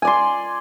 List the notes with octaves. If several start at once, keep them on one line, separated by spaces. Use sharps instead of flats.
D5 G#5 C6